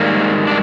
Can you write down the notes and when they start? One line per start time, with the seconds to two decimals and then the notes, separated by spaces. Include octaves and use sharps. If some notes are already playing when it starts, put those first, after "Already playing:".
Already playing: G#2 D#3 G3 A#3
0.47 D4